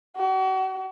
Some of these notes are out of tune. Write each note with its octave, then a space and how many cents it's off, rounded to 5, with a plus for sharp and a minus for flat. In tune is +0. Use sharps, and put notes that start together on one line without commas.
F#4 +40